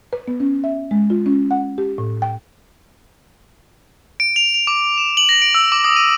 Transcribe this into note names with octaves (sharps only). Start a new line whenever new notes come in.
B4
B3
C#4
E5
G#3
F4
C#4
F#5
G4
A2
G5
D7
F7
F7
D6
E7
F#7
A#6
D7
E6
D6
D#6
D#7